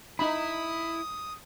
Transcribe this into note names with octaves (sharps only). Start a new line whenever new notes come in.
D#4 E4 B5 D#6